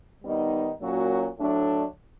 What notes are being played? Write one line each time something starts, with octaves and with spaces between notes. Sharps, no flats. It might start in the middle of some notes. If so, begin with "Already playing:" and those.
D#3 G3 B3 D#4
A#2 F#3 A#3 C#4 F#4
A2 F#3 A3 D4